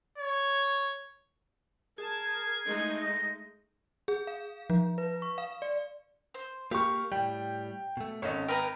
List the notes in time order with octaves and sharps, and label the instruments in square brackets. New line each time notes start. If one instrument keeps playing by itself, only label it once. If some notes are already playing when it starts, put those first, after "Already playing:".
[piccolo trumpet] C#5
[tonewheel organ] G#4 G#6 [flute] A#4 [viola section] A5
[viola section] G#3 A3 D#4
[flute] A#6
[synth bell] G#4
F5
F3
B4
C#6
F5
D5
[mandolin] C5
[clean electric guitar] A#3 [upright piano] G4 C#6 [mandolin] F5
[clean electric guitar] A2 G3 [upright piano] G5
[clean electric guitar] B2 A3
[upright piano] G#1 D#5 [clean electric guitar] C#4 A4 C#5
[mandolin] A#4 B4 A#5 [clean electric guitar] G5